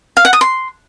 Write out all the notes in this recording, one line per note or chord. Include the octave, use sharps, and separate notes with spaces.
F5
F#5
D#6
C6